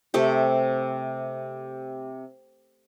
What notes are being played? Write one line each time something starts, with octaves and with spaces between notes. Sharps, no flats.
C3 A3 G4